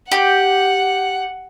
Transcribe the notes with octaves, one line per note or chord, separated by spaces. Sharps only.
G4 F#5